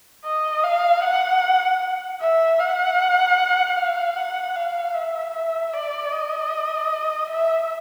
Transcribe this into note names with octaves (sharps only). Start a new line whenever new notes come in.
D#5
F5
F#5
E5
F#5
F5
F#5
F5
E5
E5
D5
D#5
E5